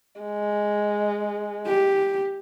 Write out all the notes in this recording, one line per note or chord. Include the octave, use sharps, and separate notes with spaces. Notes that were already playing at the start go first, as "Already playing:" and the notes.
G#3
G4